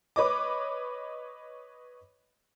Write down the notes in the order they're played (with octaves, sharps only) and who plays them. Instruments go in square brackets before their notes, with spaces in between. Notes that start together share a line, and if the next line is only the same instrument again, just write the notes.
[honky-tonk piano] B4 C#5 D#5 D6